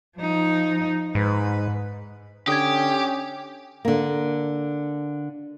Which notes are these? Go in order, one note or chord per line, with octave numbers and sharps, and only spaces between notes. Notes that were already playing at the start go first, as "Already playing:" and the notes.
F3 D#4
G#2 B4
D3 C#4 G4 D#6 G#6
D3 A#3